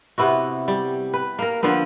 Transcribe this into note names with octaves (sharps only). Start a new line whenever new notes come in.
C3 B3 E4 F#4
G3
B4
A#3 A#4
D3 F3 A#3 B3